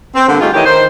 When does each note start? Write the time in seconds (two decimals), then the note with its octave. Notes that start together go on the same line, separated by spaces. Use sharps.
0.15 C4
0.27 G2 D3 A#3 B3
0.40 G3 A3 D#4 F4 G4 G#4
0.53 D#3 E3 A3 G4 C#5 D#5
0.65 D#3 C5